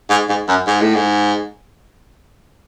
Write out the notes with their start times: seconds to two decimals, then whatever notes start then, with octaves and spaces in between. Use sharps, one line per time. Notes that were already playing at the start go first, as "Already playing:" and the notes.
0.10 G#2
0.29 G#2
0.48 F#2
0.67 G#2
0.81 A2
0.95 G#2